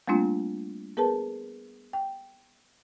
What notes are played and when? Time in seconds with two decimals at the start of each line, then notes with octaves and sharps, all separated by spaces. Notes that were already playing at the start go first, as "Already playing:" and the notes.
0.08 G3 A3 A#3 C4 D4 F4
0.97 B3 G#4 A#4 B4 A5
1.93 G5